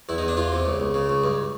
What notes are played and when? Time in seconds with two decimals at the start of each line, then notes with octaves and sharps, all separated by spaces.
0.09 E2 E4
0.18 D#4
0.23 E2
0.28 D4
0.37 E2 F4
0.52 C3
0.65 C#2
0.80 C#2
0.94 C#3
1.10 C#2
1.24 G2